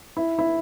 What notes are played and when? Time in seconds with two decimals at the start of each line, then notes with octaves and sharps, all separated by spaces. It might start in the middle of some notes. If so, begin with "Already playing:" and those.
0.17 E4
0.39 E4